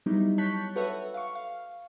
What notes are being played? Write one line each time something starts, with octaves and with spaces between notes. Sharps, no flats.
F#3 G3 B3 D#4 E4
C#5 A5 C#6 F#6 G6 B6
F#4 A4 B4 C#5 E5 F#5
F5 C#6
F5